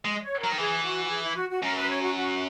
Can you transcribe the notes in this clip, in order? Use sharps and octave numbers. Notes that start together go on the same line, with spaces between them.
G#3 D#5
C#5
F#3 A#4
D#3
E3 G#4
F#4
F#4
G#4
E4
F#4
F#4
F#2 A#4
B4
C#5
F#4
F#4